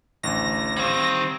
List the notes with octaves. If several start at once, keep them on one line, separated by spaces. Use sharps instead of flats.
A1 D2 A#6
D#3 G3 C4 F5 G#6